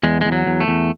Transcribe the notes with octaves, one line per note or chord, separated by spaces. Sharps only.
E2 G#3
E2 G#3
F#3
E2
A3
E2